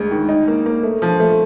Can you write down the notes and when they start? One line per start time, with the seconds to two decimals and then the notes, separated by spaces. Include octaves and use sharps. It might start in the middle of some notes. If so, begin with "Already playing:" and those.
Already playing: D2 G#3
0.11 D#3
0.29 D#4
0.48 A#3
0.66 A#3
0.83 A3
1.02 F3
1.20 A3